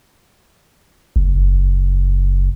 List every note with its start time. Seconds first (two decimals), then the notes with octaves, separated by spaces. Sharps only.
1.16 F#1